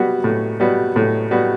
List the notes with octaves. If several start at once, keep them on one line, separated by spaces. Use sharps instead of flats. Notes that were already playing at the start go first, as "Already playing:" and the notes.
Already playing: G3 B3 F#4
A2
G3 B3 F#4
A2
G3 B3 F#4